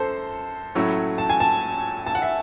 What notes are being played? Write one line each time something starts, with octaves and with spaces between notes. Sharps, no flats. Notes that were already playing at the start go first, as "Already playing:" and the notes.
Already playing: F#2 A4 C5
A2 F#3 A3 C#4 E4
A5
G#5
A5
A5
F#5
E5